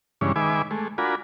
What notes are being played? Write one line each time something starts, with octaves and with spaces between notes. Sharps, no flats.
G2 C#3 E3 G#3 C#4 D4
D#3 G#3 B4 E5 G#5 D6
G#3 A3
D4 F4 F#4 A#4 G#5 B5